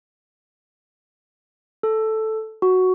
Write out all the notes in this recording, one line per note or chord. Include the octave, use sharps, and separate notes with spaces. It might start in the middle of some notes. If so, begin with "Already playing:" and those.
A4
F#4